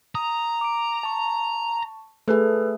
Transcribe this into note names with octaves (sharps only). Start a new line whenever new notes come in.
A#5 D#6
D6 D7
A5 C#6
A3 G#4 A4 B4